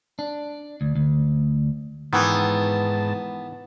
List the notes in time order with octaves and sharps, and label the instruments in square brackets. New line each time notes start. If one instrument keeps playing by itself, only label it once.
[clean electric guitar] D4
D2
D2
[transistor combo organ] G#2 A5 [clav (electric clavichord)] D#3 E3 [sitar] B3